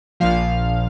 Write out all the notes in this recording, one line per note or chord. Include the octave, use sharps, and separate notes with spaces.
A#1 A#2 F3 F5